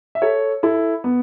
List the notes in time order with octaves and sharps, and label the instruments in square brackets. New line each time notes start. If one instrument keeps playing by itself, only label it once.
[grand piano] E5
A4 C#5
E4 A4
B3